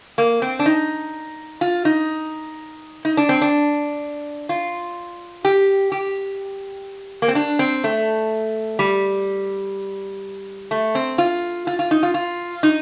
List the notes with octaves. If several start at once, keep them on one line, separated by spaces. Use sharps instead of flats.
A#3
C4
D4
D#4
F4
D#4
D#4
D4
C4
D4
F4
G4
G4
A#3
C4
D4
C4
A3
G3
A3
C4
F4
F4
F4
D#4
F4
F4
D#4